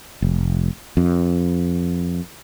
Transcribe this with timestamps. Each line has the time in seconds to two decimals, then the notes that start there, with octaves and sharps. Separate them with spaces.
0.22 F1
0.97 F2